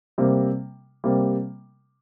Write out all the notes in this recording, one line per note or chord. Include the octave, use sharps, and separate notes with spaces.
C3 G3 A#3
C3 G3 A#3